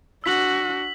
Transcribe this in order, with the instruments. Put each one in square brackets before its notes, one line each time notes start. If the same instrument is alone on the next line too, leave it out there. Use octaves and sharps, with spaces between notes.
[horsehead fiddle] D4 F#4 [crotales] E6 B6 F#7